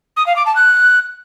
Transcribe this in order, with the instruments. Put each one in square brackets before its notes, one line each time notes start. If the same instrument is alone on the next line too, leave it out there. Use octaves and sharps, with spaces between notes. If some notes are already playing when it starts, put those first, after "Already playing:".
[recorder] D#6
F5
D6
A5
F#6